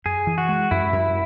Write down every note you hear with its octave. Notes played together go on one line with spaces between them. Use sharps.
F#2 G#4
E3
F#4
G#3
F#2 E4
F#2